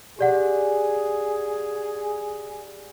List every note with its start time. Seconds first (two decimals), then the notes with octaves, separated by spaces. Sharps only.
0.19 G4 G#4 D5 F#5